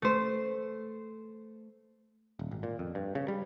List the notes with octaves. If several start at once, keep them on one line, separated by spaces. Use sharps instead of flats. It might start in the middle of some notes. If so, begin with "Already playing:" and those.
A3 C5
D#1
G#1
A#2
F2
G2
C#3
G3